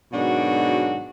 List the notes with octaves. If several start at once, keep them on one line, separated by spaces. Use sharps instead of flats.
G#2 B2 D#3 F#3 D4 F#4